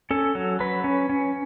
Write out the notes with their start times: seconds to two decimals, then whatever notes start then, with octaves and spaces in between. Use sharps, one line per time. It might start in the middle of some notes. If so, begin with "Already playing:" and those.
0.10 C#4 A4
0.35 F#3
0.60 F#3 B4
0.84 C#4
1.09 C#4